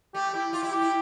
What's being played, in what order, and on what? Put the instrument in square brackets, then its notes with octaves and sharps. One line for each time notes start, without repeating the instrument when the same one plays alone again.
[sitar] A3 [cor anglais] G4
[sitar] E4 [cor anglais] G4
[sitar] F4 [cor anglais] G4
[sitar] E4
[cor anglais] G4
[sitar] E4